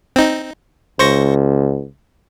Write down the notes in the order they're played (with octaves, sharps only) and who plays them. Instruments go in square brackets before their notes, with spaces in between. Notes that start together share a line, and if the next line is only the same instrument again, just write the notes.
[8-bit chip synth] C4 D#4
[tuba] C#2 [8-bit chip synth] C5 C#6 A#6